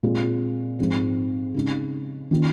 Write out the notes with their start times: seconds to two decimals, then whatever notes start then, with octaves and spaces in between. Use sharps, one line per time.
0.03 A#2 G#3 C4 F4
0.79 G#2 F3 C4
1.54 C#3 G#3 D#4
2.31 D#3 A#3 C#4 F4